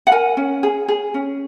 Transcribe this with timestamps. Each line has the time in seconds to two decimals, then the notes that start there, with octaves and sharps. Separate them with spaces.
0.07 F#5
0.12 A#4 G#5
0.37 C#4
0.63 G#4
0.88 G#4
1.14 C#4